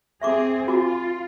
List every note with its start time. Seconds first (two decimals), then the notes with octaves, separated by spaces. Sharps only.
0.22 C4 G#4 E5 C#6 D6
0.68 F4 F#4 G#5 D6